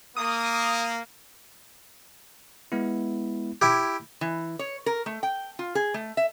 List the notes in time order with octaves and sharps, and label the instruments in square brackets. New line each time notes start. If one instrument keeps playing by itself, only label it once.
[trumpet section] A#3 [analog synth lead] D#6
[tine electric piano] G#3 B3 E4
[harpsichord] E4 G4 [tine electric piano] G#6
[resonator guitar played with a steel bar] E3
C#5
A#4
A3
G5
F4
G#4
A3
E5